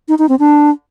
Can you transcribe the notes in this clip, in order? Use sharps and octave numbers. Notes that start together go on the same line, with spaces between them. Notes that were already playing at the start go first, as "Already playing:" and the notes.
D#4
D#4
C4
D4